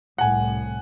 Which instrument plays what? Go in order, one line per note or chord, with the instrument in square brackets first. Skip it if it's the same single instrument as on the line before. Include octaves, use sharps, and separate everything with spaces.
[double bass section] C2 A2 [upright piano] F#5 G#5